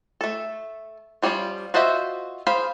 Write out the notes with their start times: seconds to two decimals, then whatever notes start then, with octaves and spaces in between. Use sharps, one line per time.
0.21 A3 A4
1.22 F3 G3 C#4 E4 F4
1.74 F4 F#4 C5 D#5 E5
2.47 G#4 C5 F5 B5